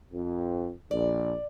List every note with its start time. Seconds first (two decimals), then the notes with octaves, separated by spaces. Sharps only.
0.12 F2
0.91 A#1 D5